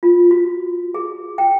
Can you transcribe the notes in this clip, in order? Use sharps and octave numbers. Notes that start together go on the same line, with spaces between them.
F4
F#4
G#4
G5